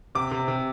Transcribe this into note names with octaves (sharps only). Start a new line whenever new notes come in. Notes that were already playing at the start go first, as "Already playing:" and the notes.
C3 D6
C3
C3